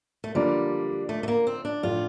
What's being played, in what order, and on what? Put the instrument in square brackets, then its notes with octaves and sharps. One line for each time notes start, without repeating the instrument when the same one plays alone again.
[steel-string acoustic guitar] A3
[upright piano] D3 F3 A#3 D4 [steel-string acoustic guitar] G3
[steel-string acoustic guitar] A3
A3
A#3
C4
D4
[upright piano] A2 F3 A3 D4 [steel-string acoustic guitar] F4